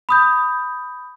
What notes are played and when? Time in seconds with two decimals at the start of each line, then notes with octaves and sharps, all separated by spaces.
0.09 B5 D#6 G6